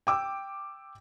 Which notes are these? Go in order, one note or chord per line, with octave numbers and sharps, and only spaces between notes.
G5 D6 E6